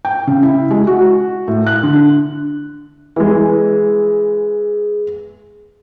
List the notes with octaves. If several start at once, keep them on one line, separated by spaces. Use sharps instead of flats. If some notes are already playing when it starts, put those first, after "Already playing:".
G5
C#3
E4
G#3
F#4
A2
F#6
D3
E3 G#3 G#4